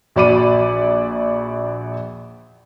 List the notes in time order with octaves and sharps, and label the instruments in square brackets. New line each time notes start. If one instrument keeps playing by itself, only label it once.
[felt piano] A#1 F#4 D5 B5 D6 D#7